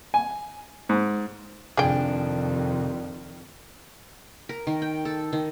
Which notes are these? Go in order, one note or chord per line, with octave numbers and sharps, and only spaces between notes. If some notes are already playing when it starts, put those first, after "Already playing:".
G#5
G#2
F2 C3 D#3 D4 G#4 G5
A#4
D#3
G5
A4
D#3